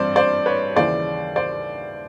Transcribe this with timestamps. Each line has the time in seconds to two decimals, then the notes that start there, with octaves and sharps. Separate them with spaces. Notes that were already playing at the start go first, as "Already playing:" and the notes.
Already playing: G2 E3 G3 C4 C5 D5
0.16 C5 D5
0.46 B4 C#5
0.76 D#2 C#3 E3 C5 D5
1.36 C5 D5